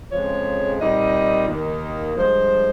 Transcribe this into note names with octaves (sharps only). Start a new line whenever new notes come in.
F2 C#3 F3 G#3 C#5
A#2 G3 C4 D#4 D#5
D#2 D#3 A#3 D#4
G2 F3 G#3 C5